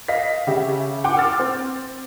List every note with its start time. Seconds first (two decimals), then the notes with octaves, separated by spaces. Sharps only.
0.08 D#5 F5 B6
0.47 C#3 G4 E5
1.04 F#5 G5 C6 D6
1.16 C6 D6 E6 F6 A6
1.39 C4